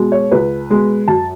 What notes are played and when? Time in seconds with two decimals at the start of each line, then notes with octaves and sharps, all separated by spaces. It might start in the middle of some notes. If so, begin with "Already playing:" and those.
Already playing: B2 G#3
0.12 C#5
0.32 C#2 B4
0.70 B2 G#3
1.08 F#2 A5